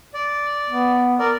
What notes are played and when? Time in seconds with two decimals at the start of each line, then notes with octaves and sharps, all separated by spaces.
0.14 D5
0.68 B3
1.19 A#4 D5